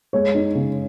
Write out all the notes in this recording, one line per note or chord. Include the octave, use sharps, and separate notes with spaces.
G#3 C#5
D#4
C#3